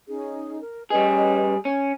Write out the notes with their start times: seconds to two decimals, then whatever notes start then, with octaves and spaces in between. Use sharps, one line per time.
0.08 C#4 D#4 G#4
0.61 A#4
0.90 G3 C#4 G#4 B4 D#5
1.65 C#4